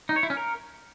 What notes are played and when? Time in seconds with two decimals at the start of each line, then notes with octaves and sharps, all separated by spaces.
0.09 D#4
0.16 C#5
0.23 E4
0.30 C#4
0.37 A#4